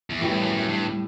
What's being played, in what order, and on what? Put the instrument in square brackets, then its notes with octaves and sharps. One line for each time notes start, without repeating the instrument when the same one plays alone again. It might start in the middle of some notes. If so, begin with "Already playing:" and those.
[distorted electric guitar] E2
[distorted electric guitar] F#2 [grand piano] A2 G3 B3
[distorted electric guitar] E2
F#2
F#2
G2